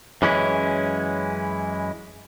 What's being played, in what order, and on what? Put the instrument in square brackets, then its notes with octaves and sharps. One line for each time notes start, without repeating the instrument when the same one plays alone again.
[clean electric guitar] F#2 E3 G#3 C#4 E4